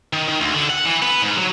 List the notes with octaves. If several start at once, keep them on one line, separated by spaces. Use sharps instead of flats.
D#3
D#3
D2
D3
F#5
E3
B3
G#2
F#3